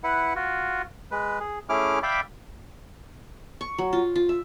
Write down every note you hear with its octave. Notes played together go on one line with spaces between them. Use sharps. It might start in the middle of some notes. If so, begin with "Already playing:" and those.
E4 B4 F#5
F4 F#4
G#3 B4
G#4
A3 C#4 E4 G#4 D6 F6
D5 E5 F5 G5 B5 D6
C#6
F#3
F4
F4
E5